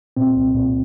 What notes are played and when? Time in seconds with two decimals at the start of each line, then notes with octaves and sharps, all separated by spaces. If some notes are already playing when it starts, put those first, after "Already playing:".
0.17 A#2 C4
0.36 C2
0.55 A#2